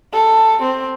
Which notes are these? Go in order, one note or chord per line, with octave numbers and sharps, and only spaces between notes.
A4
C4